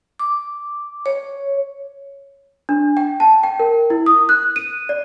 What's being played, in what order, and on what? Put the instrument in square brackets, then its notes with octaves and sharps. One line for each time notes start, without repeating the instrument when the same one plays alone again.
[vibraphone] D6
C#5
[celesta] D4
G5
A5
G5
A#4
E4
D#6
F#6
D#7
D5